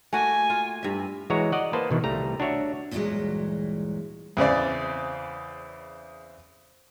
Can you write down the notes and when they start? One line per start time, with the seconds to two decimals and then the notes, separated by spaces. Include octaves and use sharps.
0.13 A3 A#3 F#4 G#5
0.50 F4
0.83 G2 E5
1.30 E3 G#3 F#4 C#5 A#5
1.52 D5 D#5 F#5
1.73 A#3 B4 C5 A5
1.91 B2 D#3 E3
2.04 C2 G3 A3 A#5
2.40 D4 F#4 C#5 E5
2.91 D2 G2 A#2 E3 F#3 G#3
4.37 E2 C#3 C4 D5